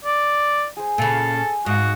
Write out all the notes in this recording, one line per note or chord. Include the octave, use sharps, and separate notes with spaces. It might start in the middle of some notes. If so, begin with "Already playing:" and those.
D5
G#4 C5
A#2 C#3 A4
G#4
G#2 F#4 D#5 F5